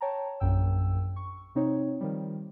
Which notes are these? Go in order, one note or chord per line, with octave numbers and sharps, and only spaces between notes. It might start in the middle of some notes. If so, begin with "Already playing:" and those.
C#5 G5 A5 A#5
A#1 F#2 G5 E6
C#6
C3 C4 D#4 C#5
D#3 F3 G3